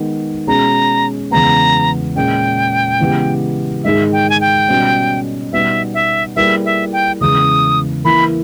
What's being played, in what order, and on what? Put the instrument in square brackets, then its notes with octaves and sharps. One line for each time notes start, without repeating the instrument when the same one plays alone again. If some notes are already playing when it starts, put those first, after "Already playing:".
Already playing: [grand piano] D#3 G#3 B3
[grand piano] B2 G#3 C#4 G#4 [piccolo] A#5
[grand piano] E2 C#3 G#3 B3 [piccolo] A#5
[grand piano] A#2 G#3 C#4 [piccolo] G5
[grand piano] C#3 E3 G#3 B3 G4
[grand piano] G#2 D#3 G#3 D#4 G#4 [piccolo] E5
[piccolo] G5
G#5
G5
[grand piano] B2 G3 C#4
[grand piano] B2 G3 B3 D#4 [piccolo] E5
[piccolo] E5
[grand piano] G3 A#3 E4 G#4 B4 [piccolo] E5
[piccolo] E5
G5
[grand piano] E2 C#3 G#3 [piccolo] D#6
[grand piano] E3 A#3 E4 [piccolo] B5